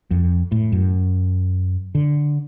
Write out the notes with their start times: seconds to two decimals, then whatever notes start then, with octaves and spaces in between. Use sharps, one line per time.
0.11 F2
0.52 A2
0.72 F#2
1.95 D3